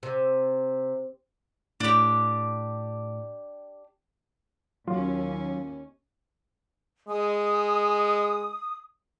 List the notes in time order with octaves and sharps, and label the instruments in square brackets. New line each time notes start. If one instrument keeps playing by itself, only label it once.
[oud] C3
[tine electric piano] A2 [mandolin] D4 G4
[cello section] D#2 C#4 [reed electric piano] F#3 [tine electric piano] F4
[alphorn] G#3 [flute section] D#6